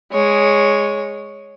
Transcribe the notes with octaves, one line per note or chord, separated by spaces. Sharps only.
G#3 C#5